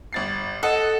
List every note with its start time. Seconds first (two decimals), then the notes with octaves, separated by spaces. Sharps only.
0.13 G1 A6 C7
0.63 A4 D#5 F#5